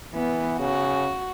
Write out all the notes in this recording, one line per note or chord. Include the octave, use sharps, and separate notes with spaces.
E3 B3
C#3 F#4